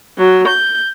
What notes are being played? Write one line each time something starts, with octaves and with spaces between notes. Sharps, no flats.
F#3
G6